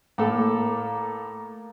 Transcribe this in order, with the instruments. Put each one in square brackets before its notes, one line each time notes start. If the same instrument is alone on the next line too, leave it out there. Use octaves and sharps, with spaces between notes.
[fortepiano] A2 A4 [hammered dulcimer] A#3